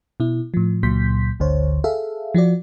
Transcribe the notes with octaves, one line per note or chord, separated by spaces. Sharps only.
B2 E4
A2 F3
C#2 A#2 F#3 C6 G6 B6
G#1 D2 D3 C5 C#5
G#4 A4 E5 F5
F3 F4 F#4 D5